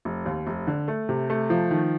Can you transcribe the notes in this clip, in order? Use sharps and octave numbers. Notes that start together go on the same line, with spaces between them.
F1
D#2
F1
D3
A3
C3
A3
F3
D#3